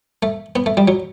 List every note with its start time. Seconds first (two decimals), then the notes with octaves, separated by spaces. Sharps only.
0.23 A3
0.56 B3
0.66 A3
0.77 G3
0.88 F#3